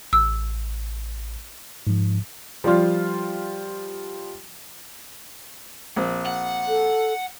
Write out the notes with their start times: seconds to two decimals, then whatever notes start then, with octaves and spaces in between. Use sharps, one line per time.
0.13 A1 E6
1.87 G#2 F3
2.64 F3 G3 F4
5.96 A#1 C4
6.25 F#5
6.68 A4